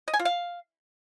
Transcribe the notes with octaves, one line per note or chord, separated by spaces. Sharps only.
D#5
G#5
F4
F5